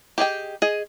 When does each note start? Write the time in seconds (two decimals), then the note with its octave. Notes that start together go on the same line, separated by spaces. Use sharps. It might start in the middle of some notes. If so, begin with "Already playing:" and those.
0.18 G4 G#4 D#5 G5
0.62 G#4 D#5